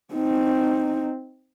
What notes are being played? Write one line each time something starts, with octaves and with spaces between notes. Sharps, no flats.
C4 D#4